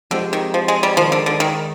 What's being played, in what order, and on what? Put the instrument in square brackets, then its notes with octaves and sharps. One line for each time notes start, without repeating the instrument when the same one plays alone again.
[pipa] D3 [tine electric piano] F3 G#3 C4 G4 C5
[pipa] D#3
F3
G#3
G3
[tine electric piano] D#3 G#3 D#4 [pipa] F3
[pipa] D3
D3
D#3